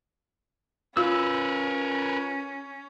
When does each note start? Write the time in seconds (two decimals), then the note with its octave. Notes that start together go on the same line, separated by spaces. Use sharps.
0.97 C#4 F4 A#4 B4 E6